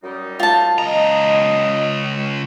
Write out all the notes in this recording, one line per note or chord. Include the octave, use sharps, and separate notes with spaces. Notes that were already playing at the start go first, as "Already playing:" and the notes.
F#2 G3 D#4
F4 A5
C#2 D#5 A#5